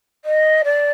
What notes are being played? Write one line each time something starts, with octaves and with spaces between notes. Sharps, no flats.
D#5
D5